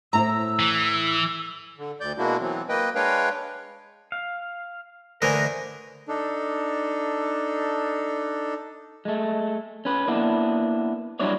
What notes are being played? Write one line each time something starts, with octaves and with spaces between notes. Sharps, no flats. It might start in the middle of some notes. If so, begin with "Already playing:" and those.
A2 E4 C5 A#5 E6
E3
D3
D2 D5 G6
B2 G#3 A#3 D4 E4 F#4
E3 F#3 B3 C4
A#3 B4 D#5 G5
G#3 D4 B4 C#5 F5 G5
F5
D3 E3 A3 A#4 C5 D#5 G#5
D4 D#4 A4
G#3 A3
C#4 B4
A#3 B3 D4 E4
F#3 G3 D4 E4 C#5 D5